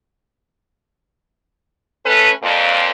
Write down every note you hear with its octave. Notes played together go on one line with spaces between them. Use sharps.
A3 C#4 A4 B4
F2 A#2